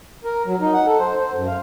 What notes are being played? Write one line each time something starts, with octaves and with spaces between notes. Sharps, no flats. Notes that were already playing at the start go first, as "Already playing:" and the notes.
A#4
F#3
D#4
F#5
A4
C5
C5
F#2
F5